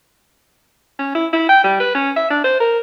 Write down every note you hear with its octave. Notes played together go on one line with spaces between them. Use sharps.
C#4
E4
E4
G5
G3
B4
C#4
E5
D4
C5
A#4